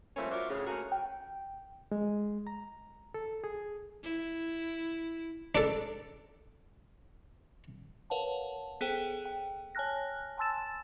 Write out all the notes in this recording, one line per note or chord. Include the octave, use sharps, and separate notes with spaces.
F3 G3 A3 A#3 C4 C#4
F4 F#4 A#4 C5 D5 E5
A2 C#3
A3 A#3 C#4 F#4 A#4
G5
G#3
A#5
A4
G#4
E4
D4 A4
A#4 B4 C#5 F5 F#5 A5
B3 G#4 A4 C5 G5
G5
C#5 G#5 A5 F6 F#6 A#6
G#5 A5 C6 E6 A6 E7